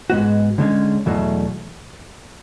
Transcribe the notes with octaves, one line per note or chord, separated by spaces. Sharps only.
G#2 G#3 B3 F#4
D3 G#3 C#4
E2 B2 F#3 A3